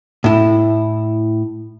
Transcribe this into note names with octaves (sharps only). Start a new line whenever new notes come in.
A2 E4